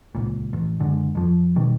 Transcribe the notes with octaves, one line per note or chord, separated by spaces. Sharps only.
D#1 C#2 A#2
A1
F#1 D3 G#3
F2 F3
B2 D#3 G3